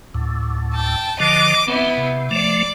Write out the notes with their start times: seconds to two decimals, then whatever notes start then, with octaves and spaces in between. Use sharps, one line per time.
0.14 D2 A2
0.75 G5 A5
1.20 D3 F3 D#5 D6
1.68 B3 C4 E4
1.97 C3
2.31 F3 A3 D5 D6